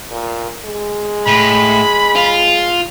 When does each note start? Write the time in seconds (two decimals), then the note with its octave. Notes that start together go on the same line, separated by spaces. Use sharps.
0.11 A#2
0.65 G#3
1.27 A2 B5
2.16 F4